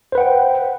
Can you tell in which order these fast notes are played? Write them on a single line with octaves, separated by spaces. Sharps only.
C5 B4 F#5 G5